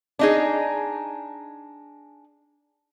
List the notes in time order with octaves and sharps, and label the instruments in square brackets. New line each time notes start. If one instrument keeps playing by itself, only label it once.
[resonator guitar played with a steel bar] D4 D#4 G#4